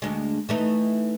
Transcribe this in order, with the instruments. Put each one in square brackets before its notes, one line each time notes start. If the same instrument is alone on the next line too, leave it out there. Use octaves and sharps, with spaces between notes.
[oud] D2 G#3
E3 A3 D#4